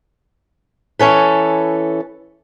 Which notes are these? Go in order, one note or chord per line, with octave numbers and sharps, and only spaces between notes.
E3 C#4 A4 B4